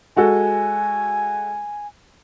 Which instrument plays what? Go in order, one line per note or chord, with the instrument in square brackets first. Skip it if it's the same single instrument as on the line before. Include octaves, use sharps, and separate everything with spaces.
[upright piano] G#3 F#4 A4 [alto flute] G#5